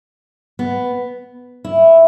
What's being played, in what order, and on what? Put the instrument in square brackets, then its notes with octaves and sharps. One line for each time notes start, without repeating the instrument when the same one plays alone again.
[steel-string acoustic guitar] B3
E4